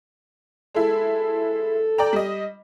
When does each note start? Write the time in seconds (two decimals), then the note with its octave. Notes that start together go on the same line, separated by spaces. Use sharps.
0.74 G#3 E4 A4
1.98 D5 G5 A#5
2.13 G3 D#5